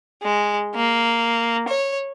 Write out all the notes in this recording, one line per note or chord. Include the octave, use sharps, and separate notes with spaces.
G#3
A#3
C#5